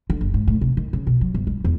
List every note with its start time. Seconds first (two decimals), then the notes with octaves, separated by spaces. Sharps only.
0.10 D3
0.21 F#1
0.34 G#2
0.47 A2
0.61 C3
0.77 D#3
0.93 C#3
1.07 B2
1.21 F#3
1.34 G1
1.47 G3
1.64 E2